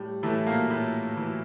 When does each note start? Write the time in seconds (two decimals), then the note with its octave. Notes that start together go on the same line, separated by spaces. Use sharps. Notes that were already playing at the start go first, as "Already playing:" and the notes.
Already playing: A2 G3
0.23 A2 E3 A3
0.47 A#2 A#3
0.70 A2
1.17 E3